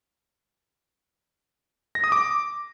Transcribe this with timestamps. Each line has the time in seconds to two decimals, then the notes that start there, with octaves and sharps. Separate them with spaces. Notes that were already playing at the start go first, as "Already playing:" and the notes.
1.95 A#6
2.04 D#6
2.12 D6